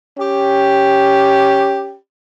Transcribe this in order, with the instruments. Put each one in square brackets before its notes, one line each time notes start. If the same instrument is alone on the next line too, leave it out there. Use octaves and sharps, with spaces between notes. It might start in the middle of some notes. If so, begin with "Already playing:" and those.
[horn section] C#4 G4